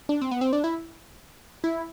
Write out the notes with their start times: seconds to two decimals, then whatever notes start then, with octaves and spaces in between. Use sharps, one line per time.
0.09 D4
0.22 C4
0.31 B3
0.41 C4
0.53 D4
0.64 E4
1.64 E4